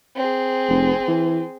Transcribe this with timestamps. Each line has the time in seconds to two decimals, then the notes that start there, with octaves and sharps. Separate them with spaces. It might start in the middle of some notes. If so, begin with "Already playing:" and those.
0.17 C4 G#4
0.69 F1
1.08 E3